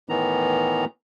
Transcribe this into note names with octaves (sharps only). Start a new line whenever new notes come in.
A2 D#3 E3 B3 A#5